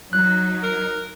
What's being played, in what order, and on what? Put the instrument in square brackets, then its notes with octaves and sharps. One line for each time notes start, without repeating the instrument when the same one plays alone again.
[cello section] F#3 D#4 [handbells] F#6
[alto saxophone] A#4